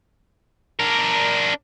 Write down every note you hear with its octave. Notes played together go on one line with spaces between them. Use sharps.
D4 A#4